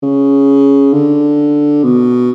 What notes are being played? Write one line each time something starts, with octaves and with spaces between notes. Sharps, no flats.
C#3
D3
B2